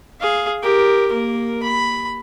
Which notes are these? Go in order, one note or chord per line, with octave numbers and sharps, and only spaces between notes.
G#4 F5
G4 A#4
A#3 A#4
B5